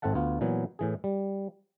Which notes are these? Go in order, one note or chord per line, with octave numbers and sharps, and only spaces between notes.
G#1 C4 A4 E5 F#5 A5
D2 B3 F4
A#2 E3 F#3 B3
A2 E3 G#4
G3